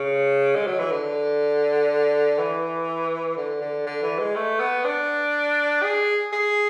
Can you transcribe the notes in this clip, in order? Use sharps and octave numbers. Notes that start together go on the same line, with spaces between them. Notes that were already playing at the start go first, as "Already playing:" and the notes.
Already playing: C#3
G#3
F#3
E3
D3
E3
D3
D3
D3
E3
G#3
A3
B3
D4
G#4
G#4